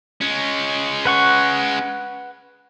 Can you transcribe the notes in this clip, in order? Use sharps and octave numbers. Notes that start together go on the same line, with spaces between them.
G#3 C#4
B4 F#5 C#6